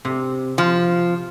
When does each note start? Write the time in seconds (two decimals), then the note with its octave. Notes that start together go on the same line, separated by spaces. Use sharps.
0.05 C3
0.58 F3